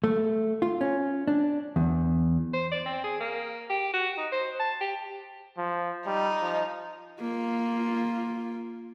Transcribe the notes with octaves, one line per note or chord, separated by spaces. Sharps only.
A3
F4
C#4
D4
E2
C5
D5
C4
G#4
A#3
G4
F#4
D#4
C5
A5
G4
F3
G3 D#4
F3
A#3 F4